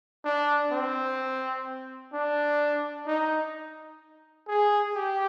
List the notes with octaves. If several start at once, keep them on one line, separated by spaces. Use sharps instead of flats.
D4
C4
D4
D#4
G#4
G4